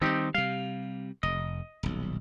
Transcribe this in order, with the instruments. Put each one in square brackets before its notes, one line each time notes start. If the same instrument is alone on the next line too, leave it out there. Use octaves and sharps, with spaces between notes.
[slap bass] D#3 F#3 G3 [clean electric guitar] C4 D#4 G4
[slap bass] C3 G3 [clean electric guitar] F5
[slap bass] F1 [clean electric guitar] D#5
[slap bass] D#1 B1